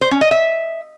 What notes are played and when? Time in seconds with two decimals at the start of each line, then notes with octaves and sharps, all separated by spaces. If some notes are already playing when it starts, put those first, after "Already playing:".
0.01 C5
0.11 C#4
0.21 D#5
0.31 E5